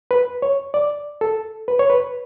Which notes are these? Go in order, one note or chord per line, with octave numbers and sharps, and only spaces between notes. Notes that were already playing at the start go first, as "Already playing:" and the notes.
B4
C#5
D5
A4
B4
C#5
B4